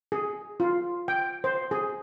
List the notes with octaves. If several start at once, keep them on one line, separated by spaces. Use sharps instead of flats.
G#4
F4
G5
C5
G#4